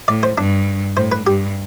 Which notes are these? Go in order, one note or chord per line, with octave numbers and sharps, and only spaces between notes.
A2 D5
C5
G2 D4
A2 C5
B4
G2 G4